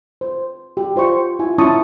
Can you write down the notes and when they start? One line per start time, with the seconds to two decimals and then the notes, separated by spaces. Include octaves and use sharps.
0.21 C5
0.77 G4
0.96 F4 C5 D5 C#6
1.39 E4 F4 G#5
1.58 C#4 E4 A5 C#6 D#6